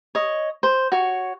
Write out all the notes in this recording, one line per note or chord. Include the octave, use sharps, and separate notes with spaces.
C#5 D#5
C5
F#4 C#5